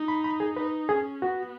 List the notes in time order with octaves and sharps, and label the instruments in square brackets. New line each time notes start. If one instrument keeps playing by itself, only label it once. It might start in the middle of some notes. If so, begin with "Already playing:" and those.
Already playing: [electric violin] D#4
[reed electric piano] B5
B5
G#4
[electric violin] D#4 [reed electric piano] B4
[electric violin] C#4 [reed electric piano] G#4
[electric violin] B3 [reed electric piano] F#4